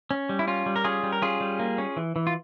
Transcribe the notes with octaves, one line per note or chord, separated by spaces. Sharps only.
C#4
G3
E4
C#4 F4
G3
A#4
C#4 F4 G#4
G3
A#4
C#4 F4 G#4
G3
A#3
C#4
E3
E3
F4